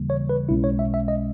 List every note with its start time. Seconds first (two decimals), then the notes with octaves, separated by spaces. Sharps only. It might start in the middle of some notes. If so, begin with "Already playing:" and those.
Already playing: D#2 C#3 E3 G3 A#3
0.10 C#5
0.29 B4
0.49 B1 B2 G#3 C#4 E4
0.64 C#5
0.79 E5
0.94 E5
1.08 D#5